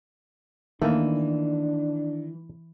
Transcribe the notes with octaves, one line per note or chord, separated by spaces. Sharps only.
D#3 E3 A3 A#3 D4